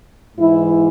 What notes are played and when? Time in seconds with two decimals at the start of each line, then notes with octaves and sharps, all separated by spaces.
0.36 G#2 E3 E4